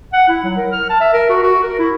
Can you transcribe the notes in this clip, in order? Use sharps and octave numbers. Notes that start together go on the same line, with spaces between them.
F#5
E4
F#3
A#4
F6
A5
E5
A#4
F#4
F#4
A#4
E4